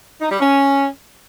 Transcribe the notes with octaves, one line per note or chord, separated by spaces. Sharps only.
D#4
G3
C#4